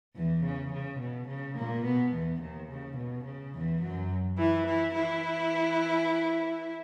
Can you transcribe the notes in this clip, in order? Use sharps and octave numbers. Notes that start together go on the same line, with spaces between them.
E2 E3
C#3
C#3
B2
C#3
A#2 A#3
B2 B3
E2 E3
D#2 D#3
C#3
B2
C#3
E2 E3
F#2 F#3
E3 E4
E3 E4
E3 E4